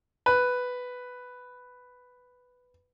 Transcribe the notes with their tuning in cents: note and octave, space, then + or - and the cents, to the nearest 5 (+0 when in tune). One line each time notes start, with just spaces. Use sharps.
B4 +5